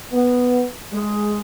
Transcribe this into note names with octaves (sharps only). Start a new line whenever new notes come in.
B3
G#3